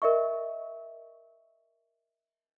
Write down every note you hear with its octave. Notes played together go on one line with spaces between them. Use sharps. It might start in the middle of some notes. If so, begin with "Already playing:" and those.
A#4 D#5 E5 C#6